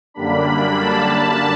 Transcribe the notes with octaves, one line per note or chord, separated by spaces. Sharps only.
F#2 D3 G3 A#3 D4 B5
A5
A5